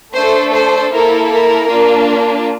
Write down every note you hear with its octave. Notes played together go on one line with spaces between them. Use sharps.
A3 D4 A4 C5
C5
A#3 E4 A4 A#4
A#4
A#3 D4 F4